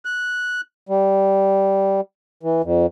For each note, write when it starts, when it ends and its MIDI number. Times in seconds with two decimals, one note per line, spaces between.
0.05 0.61 90
0.89 2.01 55
2.43 2.62 52
2.64 2.86 41